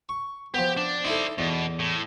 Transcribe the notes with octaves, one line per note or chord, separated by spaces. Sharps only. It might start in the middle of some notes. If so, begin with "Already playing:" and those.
C#6
F3 B3 G4
D4
D#4 E4 A4 C5 D5
E2 B2
A2